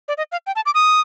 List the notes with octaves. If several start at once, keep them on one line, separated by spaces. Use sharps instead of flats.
D5
D#5
F5
G5
A5
D6
D#6